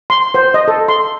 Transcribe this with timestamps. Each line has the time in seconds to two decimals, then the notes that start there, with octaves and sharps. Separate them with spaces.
0.10 C6
0.34 C5
0.54 D#5
0.68 A4
0.88 C6